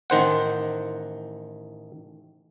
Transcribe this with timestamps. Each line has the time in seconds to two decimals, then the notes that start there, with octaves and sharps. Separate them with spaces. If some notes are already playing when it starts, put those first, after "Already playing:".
0.10 A1 D#3 C5 F#5